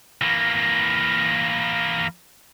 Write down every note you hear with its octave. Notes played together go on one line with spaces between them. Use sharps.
E3 A#3